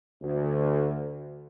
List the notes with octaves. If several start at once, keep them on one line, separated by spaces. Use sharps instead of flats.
D2